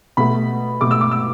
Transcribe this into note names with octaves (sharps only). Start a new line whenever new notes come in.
B2 A3 B5
B2 A3 D6
E6
D6
E6